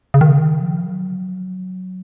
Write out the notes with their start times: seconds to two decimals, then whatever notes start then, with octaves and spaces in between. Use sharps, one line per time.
0.14 C#3
0.21 D#3
0.29 C#3
0.37 D#3
0.61 F3
0.85 F#3